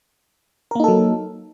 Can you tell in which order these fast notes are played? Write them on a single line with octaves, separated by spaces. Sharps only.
A#4 A#3 D#4 A4 F#3